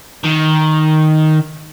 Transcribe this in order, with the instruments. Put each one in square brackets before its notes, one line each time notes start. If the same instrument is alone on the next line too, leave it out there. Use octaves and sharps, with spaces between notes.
[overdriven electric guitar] D#3